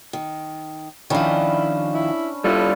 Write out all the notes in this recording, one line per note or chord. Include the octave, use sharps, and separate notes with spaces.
D#3
D#3 F3 C#4 D4 E4 B4
E4
G3 D4 E4 F4 A4